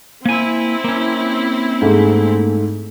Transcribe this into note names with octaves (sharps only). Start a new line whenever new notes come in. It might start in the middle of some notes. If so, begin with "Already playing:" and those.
A#3 C4 E4 G#5
A#3 C#4
G#2 A3